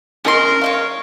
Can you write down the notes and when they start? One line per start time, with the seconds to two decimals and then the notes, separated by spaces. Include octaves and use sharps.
0.25 C#4 A#4 D#5 C6
0.62 C#5 D#5 F5